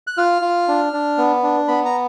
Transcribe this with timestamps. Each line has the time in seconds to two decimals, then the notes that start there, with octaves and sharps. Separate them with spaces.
0.07 F#6
0.18 F4 F6
0.42 F4
0.68 D4
0.93 D4
1.18 B3
1.43 D4
1.68 B3 B5
1.85 A#5